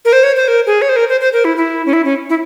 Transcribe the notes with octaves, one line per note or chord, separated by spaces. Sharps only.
A#4
C5
C#5
C5
A#4
G#4
C#5
C5
A#4
C5
C5
A#4
E4
E4
C#4
E4
C#4
E4